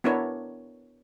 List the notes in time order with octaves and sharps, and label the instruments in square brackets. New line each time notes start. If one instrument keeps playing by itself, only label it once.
[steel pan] B3 D4 E4 A#4 C#5